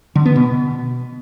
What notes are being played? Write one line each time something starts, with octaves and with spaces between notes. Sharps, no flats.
D3
B3
B2